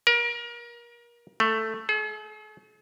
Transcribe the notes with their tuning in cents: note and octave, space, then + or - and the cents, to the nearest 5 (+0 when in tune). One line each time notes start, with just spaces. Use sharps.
A#4 +30
A3 +5
G#4 +45